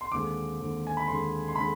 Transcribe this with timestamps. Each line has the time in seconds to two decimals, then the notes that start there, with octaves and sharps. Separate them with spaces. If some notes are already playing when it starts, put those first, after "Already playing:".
0.01 C6
0.12 D#2 D3 G#3 C4 D6
0.60 D#2 D3 G#3 C4
0.87 G#5
0.97 B5
1.08 D#2 D3 G#3 C4 C6
1.48 C6
1.56 D3 G#3 C4 B5